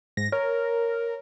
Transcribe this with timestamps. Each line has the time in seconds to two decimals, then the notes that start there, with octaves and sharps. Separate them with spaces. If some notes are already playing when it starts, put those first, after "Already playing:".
0.17 G#2 A#6
0.32 A#4 C#5